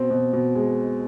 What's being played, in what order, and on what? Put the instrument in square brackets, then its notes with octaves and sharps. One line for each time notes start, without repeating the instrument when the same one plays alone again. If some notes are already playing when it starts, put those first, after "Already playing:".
Already playing: [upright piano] B2 C4
B2
B2
G#3